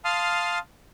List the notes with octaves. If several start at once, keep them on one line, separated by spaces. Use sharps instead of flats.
F5 A5 C6 D#6 F6